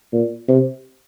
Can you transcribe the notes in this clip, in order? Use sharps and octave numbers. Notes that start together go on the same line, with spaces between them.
A#2
C3